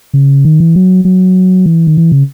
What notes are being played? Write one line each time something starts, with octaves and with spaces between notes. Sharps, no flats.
C#3
D#3
E3
F#3
F#3
E3
D#3
E3
C#3